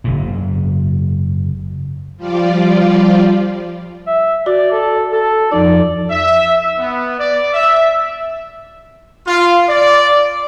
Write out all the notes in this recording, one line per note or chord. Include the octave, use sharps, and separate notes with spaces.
F#1 G#2
F3 G3 F4 D5
E5
F#4 D5
A4
A4
F2 F3 D#4 D5
E5
B3
D5
E5
F4
D5